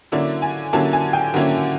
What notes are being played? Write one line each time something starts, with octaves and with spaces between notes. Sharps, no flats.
D3 F#3 A#3 C#4 E4 D5
G#5
D3 F#3 A#3 C#4 E4 A5
G#5
G5
D3 F#3 A#3 C#4 E4